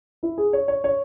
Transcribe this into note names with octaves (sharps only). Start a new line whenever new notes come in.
E4
G#4
C#5
C#5
C#5